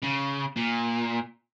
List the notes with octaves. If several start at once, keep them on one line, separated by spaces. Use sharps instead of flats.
C#3
A#2